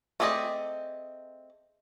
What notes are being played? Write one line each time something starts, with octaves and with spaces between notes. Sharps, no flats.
A3 C4 G#4 D5 D#5